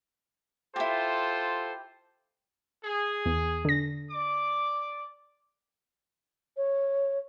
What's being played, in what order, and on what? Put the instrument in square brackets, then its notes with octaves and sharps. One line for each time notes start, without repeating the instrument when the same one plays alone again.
[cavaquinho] E4 G4 [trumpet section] F4 A4 C5
[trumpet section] G#4
[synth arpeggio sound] E2
D3 A#6
[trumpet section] D5 D6
[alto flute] C#5